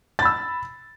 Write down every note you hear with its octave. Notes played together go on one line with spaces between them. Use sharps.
B5 E6 A6